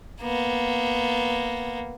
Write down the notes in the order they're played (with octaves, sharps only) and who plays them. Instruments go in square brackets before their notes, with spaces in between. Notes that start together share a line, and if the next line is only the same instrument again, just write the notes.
[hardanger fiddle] A#3 B3